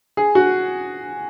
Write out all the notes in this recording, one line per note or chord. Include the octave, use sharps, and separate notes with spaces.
G#4
F#4